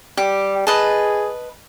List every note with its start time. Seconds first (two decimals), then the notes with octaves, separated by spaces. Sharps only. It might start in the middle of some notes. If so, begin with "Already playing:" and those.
0.17 G3 G4
0.67 G#4 B4 D#5 A5